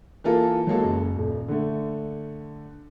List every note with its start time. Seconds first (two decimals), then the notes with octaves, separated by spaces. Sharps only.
0.24 E3 A#3 F4 A4 A#4
0.67 F#3 G#3 A#3 A4
0.84 F#1
1.17 D#1
1.48 D3 A3